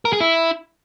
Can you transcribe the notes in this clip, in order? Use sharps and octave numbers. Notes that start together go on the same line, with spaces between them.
A#4
G#4
E4